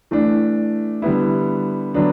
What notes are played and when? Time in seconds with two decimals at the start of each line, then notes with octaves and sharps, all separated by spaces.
0.11 E3 A3 D4
1.02 D3 G3 B3 E4
1.94 D3 F#3 B3 D4